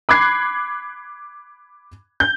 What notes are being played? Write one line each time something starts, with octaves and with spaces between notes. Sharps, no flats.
B5 D6 F#6 G#6 C7
G6